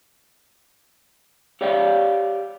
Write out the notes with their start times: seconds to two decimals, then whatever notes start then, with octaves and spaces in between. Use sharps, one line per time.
1.61 G4 C#5 D5 F5 G5